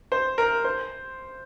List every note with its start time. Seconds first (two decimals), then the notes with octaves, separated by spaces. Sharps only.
0.12 C5
0.38 A#4
0.64 C5